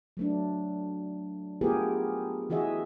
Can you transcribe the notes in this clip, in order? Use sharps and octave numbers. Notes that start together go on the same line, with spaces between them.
F#3 A3 D4
A3 B3 F4 G4 G#4 A#4
E3 F#4 G#4 D#5 E5